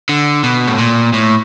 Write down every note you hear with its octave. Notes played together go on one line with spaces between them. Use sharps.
D3
B2
A2
A#2
A2